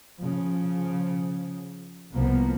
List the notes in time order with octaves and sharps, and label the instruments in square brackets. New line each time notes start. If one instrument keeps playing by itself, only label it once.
[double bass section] C#3 F3
C2 F3 A#3 B3